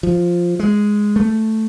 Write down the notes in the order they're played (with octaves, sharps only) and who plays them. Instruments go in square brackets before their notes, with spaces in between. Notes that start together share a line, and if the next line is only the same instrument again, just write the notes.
[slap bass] F3
G#3
A3